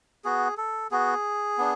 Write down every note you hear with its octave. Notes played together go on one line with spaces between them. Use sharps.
B3 F#4 G#4
A4
B3 F#4 G#4
B3 D4